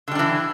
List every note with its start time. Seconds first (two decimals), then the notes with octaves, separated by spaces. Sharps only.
0.08 D3
0.11 G3
0.15 D4
0.19 E3